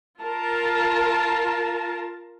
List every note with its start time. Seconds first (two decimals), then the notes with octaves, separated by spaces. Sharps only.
0.20 F4 A#4 A5